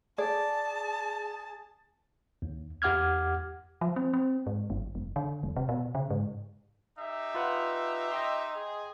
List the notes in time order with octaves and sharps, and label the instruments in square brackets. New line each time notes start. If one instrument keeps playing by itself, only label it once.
[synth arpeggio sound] G#4 [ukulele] D5 [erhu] A5
[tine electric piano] D#2
E2 G4 F#5 D6 F6 G#6
[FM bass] F3
C4
C4
G#2
G1
F1
D3
E1
C3
B2
C#3
G#2
[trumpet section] D#4 G4 E5
[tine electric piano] F4 B4 F#5
D#5 G5 C6
[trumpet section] G#4